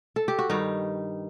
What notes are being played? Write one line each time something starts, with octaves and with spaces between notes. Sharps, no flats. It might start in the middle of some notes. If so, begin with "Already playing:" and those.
A4
G4
F#4
G2 D#3 G3 D#4